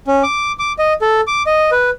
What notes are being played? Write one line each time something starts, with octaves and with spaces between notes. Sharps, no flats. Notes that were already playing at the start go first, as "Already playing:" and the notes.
C#4
D6
D6
D#5
A4
D6
D#5
B4